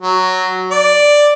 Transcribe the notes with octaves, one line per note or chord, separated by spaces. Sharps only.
F#3
D5